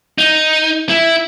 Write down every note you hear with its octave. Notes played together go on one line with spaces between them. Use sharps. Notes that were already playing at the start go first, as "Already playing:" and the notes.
D#4
E4